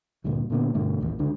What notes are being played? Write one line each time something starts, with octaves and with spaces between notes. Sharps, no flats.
D2 G2 A#2 D3
A#2 D3 B3
G2 B2 D3 A3
A1 D#2
C#2 D3 D4